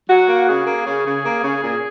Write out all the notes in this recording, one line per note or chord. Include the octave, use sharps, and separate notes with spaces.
F#3 F#4
A#3
C#3 G#4
A#3
C#3
C#3
A#3
C#3
A#2